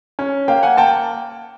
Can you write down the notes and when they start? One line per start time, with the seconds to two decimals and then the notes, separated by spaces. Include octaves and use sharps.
0.19 C#4
0.48 A#3 F5 G5
0.63 F#5 G#5
0.77 A#3 G5 A5